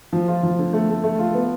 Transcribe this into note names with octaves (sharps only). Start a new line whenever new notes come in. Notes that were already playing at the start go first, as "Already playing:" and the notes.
F3
F4
F3
D3
A3
A3
A3
F4
B3